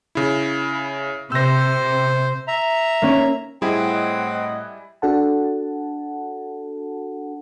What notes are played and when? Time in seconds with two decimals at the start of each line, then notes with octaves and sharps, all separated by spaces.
0.15 C#3 E4
1.32 C3 C5 E6 A#6
2.48 E5 A#5
3.02 A#3 C#4
3.62 A2 G3 C4 E4 G#4 D#5 F#5
5.02 D4 F#4 A4 F#5 A5